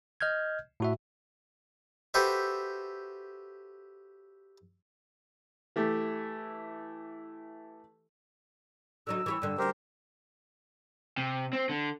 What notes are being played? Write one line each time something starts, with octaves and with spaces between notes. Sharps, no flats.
D#5 F6 G6 G#6
A2 F#4 E5
F#4 G4 A4 B4 C5 E5
E3 A3 G4 A4
D3 F#3 D#4 E6
E3 G4 C#5
G2 D3
D2 G#2 G4 A#4 C5
C3
C4
D3